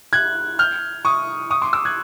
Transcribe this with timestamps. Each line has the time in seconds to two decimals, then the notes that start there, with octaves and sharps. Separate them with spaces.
0.13 F#6 G#6
0.59 F6 G6
1.05 C#6 D#6
1.51 C#6 D#6
1.62 C6 D6
1.73 D6 E6
1.85 F#6 G#6